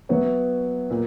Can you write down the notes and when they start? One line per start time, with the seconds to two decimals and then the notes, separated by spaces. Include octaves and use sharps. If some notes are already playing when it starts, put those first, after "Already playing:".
0.09 F#3 B3 F#4 C#5 E5
0.90 A#2